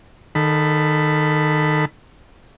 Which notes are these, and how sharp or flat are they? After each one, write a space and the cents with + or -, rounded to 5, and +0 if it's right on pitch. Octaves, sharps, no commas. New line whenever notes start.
D#3 -20 A4 +0 B5 +10